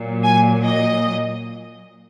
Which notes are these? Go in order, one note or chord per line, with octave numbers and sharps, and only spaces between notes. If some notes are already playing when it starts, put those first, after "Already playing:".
Already playing: A#2 F#3
G#5
D#5